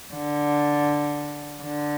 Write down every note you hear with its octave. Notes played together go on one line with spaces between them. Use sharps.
D3
D3